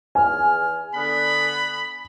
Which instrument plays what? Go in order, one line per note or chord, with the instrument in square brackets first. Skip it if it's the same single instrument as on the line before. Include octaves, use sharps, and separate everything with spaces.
[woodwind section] E2 F6 [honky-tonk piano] G#5
[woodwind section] D3 B3 [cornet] B5